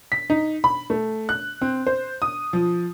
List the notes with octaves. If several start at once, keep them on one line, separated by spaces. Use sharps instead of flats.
B6
D#4
B5
A3
F#6
C4
C5
D#6
F3